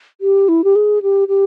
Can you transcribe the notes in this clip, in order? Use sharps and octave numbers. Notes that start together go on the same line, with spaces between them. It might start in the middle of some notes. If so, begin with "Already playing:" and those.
G4
E4
G4
G#4
G4
G4